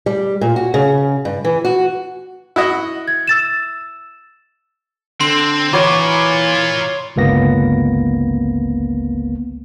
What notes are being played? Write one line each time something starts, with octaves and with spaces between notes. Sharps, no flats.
G3
A#2
F#4
C#3
G2
E3
F#4
E4 F#4 D#5
G#6
E6 A6 E7
D3 C4 C6
E3 F4 A#4 C#5 B5 D6
G1 C#2 A#3 B3 A#6